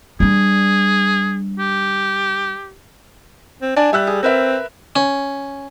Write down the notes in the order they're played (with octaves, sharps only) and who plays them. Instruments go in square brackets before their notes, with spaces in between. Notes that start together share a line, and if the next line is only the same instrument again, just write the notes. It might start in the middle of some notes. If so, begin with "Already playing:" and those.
[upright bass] G3 D4 [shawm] G#4
[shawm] G4
[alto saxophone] C4
[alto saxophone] D4 [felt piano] D5 G#5 A5
[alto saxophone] G3 [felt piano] E5 E6 F#6
[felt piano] G#4
[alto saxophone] C4 [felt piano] A#4 B4 E5
[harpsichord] C#4